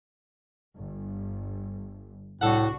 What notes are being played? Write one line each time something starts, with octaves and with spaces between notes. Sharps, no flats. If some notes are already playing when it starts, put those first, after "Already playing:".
G1
C2 A2 D4 F#4 A4 F#5